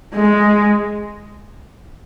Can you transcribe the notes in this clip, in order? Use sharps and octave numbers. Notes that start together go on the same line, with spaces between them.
G#3